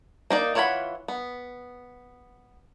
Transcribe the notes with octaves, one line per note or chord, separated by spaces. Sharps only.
A#3 D#4 D5
E3 F4 C#5 F#5 B5
B3